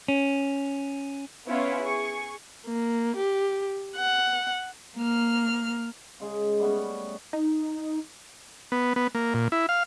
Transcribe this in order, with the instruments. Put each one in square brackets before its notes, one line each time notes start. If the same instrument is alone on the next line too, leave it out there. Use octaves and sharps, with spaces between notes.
[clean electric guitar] C#4
[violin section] B3 C#4 E4 F4 C#5
G#4 C#6
[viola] A#3
G4
F#5
[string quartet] A#3 F6
[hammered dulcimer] C#3 G#3 G#4
G3 A3 B3 C#4
[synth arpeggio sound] D#4
[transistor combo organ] B3
B3
A#3
A#2
E4
F5